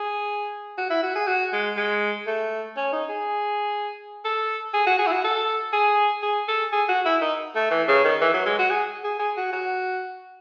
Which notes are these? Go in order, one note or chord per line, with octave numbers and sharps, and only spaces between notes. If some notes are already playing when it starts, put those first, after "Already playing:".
Already playing: G#4
F#4
E4
F#4
G#4
F#4
G#3
G#3
A3
C#4
D#4
G#4
A4
G#4
F#4
G#4
E4
F#4
A4
G#4
G#4
A4
G#4
F#4
E4
D#4
A3
E3
C#3
D#3
E3
F#3
G#3
F#4
G#4
G#4
G#4
F#4
F#4